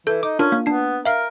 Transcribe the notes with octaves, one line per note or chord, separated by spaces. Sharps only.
E3 A4 G6
D#4 D6
C#4 D4 F4 A#4
A#3
B3 D4 C7
A#4 E5 F5